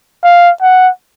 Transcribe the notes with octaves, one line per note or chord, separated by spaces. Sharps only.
F5
F#5